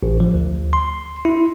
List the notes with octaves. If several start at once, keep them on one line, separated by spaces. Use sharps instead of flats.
A1
F3
D2
C6
E4